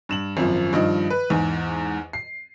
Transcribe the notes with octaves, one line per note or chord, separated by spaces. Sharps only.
G2 E7 F#7
G#1 F#2 F3
G2 D#3 F3 D#5
B4
E2 G#2
C7